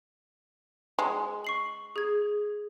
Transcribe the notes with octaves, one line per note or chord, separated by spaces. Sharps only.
G#3
C#6 C7 F#7
G#4 G#6